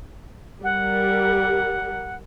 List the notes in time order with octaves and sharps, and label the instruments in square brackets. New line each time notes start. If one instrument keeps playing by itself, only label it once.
[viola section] G3 A#4 [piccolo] F#5